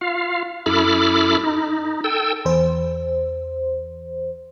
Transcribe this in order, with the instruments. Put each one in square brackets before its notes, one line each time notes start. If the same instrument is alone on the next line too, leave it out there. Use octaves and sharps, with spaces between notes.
[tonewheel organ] F4 F5
F#2 E4 A4 B5 D6 F6
D#4
A4 G5 E6
[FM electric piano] E2 C5